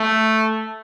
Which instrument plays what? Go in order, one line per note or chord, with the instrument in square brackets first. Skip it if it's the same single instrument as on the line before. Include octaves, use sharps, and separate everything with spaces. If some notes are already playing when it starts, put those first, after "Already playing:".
Already playing: [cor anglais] A3